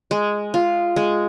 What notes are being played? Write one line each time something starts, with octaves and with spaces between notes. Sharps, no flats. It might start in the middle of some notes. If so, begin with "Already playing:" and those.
G#3
F4
G#3